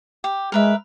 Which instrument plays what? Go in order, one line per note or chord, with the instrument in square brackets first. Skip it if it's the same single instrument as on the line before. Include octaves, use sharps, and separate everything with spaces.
[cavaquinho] G4
[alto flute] G#3 [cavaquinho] A#4 B4 E5